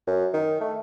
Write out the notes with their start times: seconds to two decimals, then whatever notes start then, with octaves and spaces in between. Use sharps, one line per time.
0.07 F#2
0.33 D#3
0.61 A3